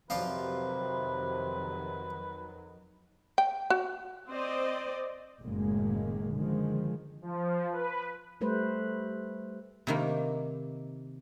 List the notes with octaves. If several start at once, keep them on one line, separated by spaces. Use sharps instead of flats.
F2 C3 D#3 F3 F#3 F4 B4 D5
G5
F#4
C4 C5 D5 D#5
F#1 F#2 A2 D#3 G#3 A#3
D3 D#3 F3 G#3
F3
B4
G3 A3 B4 C5
C3 D#3 A#3